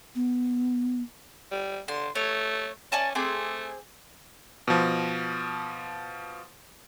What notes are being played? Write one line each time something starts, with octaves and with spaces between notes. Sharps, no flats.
B3
G3
D3 C6
A3 C#5
C#4 D5 G#5 A5
A3 C4 G#4 D6
B2 F3